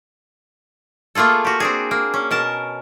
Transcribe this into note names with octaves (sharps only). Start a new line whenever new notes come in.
A3 A#3 F4 G#4 A4
F#4 G4
C4 D4 G#4
A#3
C#4
B2 A#4 A5